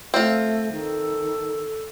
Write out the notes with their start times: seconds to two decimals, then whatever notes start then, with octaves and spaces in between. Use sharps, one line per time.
0.14 A3 C4 F4
0.72 D#3 A4